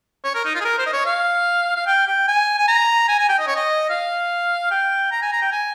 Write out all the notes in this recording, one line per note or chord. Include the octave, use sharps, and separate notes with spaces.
C#5
A#4
D#4
F4
G#4
A#4
C5
D#5
C#5
F5
F5
G5
G5
G#5
G#5
A#5
G#5
G#5
G5
D#5
C#5
D#5
F5
G5
A#5
G#5
A#5
G5
G#5